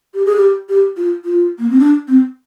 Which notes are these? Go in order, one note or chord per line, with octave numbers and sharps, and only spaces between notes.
G4
G#4
G4
G4
F4
F4
A#3
C4
D4
C4